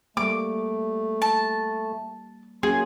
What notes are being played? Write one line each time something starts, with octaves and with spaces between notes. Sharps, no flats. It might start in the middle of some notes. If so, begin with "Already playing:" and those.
G3 A3 A#3 D6
A5
F#3 A#3 C#4 G#4 C6